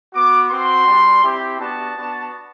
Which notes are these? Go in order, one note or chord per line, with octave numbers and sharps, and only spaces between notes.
B3 F#4 D6
C4 F#4 C6
G3 D4 G4
C4 E4 G4
B3 D4 F#4 A5
B3 D4 F#4